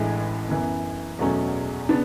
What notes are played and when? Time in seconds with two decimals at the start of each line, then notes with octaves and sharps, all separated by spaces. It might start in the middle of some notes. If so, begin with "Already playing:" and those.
Already playing: A1 A2 E3 G#3 D4
0.49 F#2 E3 B3
1.19 E2 B2 F#3 A3 C#4
1.89 C#3 B3 D4